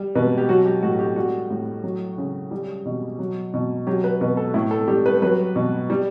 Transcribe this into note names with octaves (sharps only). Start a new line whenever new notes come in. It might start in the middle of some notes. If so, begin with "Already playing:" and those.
Already playing: G3
B2 B4
G4
F#3 F#4
G4
A2 F#4
G4
G3 F#4
A2
F#3
C#3
G3
B2
F#3
B2
F#3 G4
B4
B2 B4
A4
A2 E4
A4
G3 G4
B4
F#3 B4
B2
G3